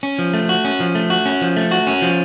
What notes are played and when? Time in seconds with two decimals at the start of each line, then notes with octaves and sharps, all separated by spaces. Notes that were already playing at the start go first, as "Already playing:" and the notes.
0.03 C#4
0.19 F3
0.34 A3
0.49 F#4
0.65 C#4
0.80 F3
0.95 A3
1.10 F#4
1.26 C#4
1.41 F3
1.56 A3
1.71 F#4
1.87 C#4
2.02 F3